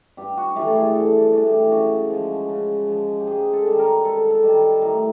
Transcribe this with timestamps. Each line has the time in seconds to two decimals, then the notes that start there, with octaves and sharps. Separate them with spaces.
0.17 G2 G4
0.37 F#4
0.56 E3 A3 D4 G4
0.67 A4
0.76 G#4
0.95 G2 A4
1.33 E3 A3 D4
1.47 G4
1.72 C#3 F#4
2.10 F3 G#3
2.49 C#3
2.88 F3 G#3
3.20 G4
3.27 G#2 G#4
3.53 A4
3.66 D#3 G3
3.79 A#4
4.04 G#2 A4
4.30 A4
4.43 D#3 G3
4.82 A2 A#4